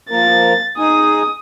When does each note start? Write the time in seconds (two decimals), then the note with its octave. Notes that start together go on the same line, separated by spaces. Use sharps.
0.11 F3 A#3 A#4 A6
0.78 D#4 G#4 G#5 D#6